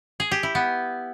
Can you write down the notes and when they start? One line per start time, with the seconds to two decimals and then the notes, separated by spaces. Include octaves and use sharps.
0.20 G#4
0.31 G4
0.43 E4
0.55 B3